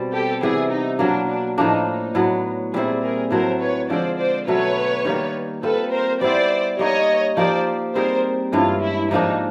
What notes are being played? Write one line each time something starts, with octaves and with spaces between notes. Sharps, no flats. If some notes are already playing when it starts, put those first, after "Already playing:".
Already playing: B2 G3 C4
G4 A4
C3 E3 G3 B3 G#4
D#4
B2 F#3 A#3 D4
D4
A2 F3 A#3 D4 D#4
D#4
A2 F#3 B3
A#2 G3 C4 E4 G#4
G#4 A#4
A2 F#3 A3 A#4 C5
B4 C#5
D3 F3 G#3 C5 D5
C5 D5
B2 F#3 A3 B4 C#5
D#3 G3 A#3
G3 C4 F4 A4 B4
A#4 C5
G3 B3 E4 G4 C5 D5
G3 A#3 D#4 C#5 D#5
F3 A#3 D#4 G4 C5 D5
G3 C4 D#4 G#4 A#4 C5
G2 E3 G#3 C#4 F4
E4
G#2 F3 A#3 D4 D#4